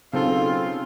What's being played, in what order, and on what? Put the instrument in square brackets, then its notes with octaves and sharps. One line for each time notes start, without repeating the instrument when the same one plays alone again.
[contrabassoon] B1 [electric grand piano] C#3 C4 A4 [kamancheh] F4